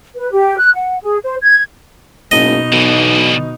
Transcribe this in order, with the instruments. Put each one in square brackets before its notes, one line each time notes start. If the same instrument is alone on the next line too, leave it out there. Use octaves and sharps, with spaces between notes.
[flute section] B4
G4
F#6
F#5
G#4
C5
G#6
[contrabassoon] F#1 [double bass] B2 D#4 [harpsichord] D#5
[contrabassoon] B1 [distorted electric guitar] D3 E3